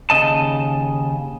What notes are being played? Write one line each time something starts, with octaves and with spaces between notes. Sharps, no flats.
D#2 C#3 D#5 A5